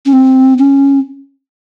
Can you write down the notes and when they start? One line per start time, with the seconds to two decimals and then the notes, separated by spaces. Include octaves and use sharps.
0.06 C#4
0.13 C4
0.58 C#4